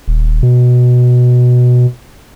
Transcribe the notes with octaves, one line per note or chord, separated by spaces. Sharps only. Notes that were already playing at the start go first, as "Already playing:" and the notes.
D#1
B2